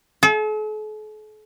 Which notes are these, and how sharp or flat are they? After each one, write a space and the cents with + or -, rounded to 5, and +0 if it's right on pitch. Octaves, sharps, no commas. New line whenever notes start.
A4 -45